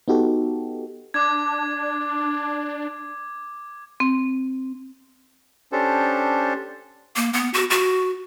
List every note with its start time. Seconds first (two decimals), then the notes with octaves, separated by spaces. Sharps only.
0.08 B3 D#4 F#4 G4 A4
1.14 D4 D6 G#6
4.00 C4
5.72 C#4 D4 G4 A4 C5
7.16 A#3
7.33 B3
7.54 F#4
7.70 F#4